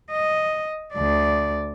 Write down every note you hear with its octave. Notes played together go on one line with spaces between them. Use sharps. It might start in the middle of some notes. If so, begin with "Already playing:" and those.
D#5
D2 D5